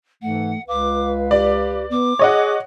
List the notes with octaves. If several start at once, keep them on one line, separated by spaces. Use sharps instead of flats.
G#2 E3 A3 F#5
C#2 B4 F5 D6
G4 D5
B3 D6
G#4 C#5 D#5 F#5